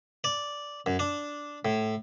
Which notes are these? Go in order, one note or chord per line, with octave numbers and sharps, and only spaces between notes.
D5
F#2
D4
A2